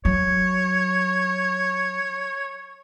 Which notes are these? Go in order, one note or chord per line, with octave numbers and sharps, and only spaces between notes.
F#3 C#5